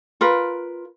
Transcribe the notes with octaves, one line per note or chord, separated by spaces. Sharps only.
F4 A#4 B4